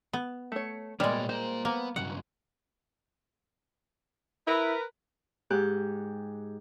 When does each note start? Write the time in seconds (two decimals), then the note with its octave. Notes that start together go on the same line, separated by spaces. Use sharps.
0.13 B3
0.52 A3 C#5
1.00 A#2 G3 G#3 A#3 B3 A#4 C#5 D5
1.29 A#3 F4 A#4 C5
1.65 A#3 B3
1.96 G2 C#3 F#3 F#5
4.47 E4 A#4 B4
5.50 G#2 G4 F#6